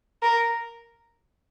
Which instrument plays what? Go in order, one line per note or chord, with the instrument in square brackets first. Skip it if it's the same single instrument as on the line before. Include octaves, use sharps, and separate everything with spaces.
[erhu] A#4